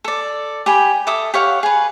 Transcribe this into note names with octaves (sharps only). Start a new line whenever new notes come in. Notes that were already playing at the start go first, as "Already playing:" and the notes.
A4 D5
G4 G5 G#5 B5
A4 E5 D6 D#6
G4 C#5 F5 F#5
G#4 B4